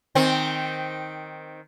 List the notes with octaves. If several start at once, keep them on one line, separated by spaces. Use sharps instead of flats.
D#3 C4